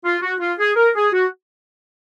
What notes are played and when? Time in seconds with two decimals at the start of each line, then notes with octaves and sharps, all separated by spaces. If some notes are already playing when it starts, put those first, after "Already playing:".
0.05 F4
0.22 F#4
0.40 F4
0.58 G#4
0.76 A#4
0.95 G#4
1.13 F#4